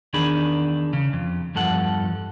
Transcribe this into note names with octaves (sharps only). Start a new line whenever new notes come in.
E2 D#3 D4 G#4 B5
C#3
F2
E2 G2 F3 A4 F#5